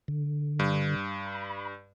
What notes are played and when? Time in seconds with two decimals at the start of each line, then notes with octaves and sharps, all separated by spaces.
0.08 D3
0.59 G2
1.25 B5